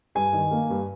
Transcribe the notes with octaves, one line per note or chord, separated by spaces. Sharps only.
G2 G#5
D#3
A#3
G2